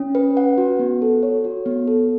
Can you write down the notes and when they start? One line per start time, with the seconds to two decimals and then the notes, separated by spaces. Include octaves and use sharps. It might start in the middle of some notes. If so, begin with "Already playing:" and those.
Already playing: C#4
0.15 B4
0.37 F#5
0.58 F#4
0.79 B3
1.02 A4
1.23 C#5
1.44 F#4
1.66 B3
1.87 A4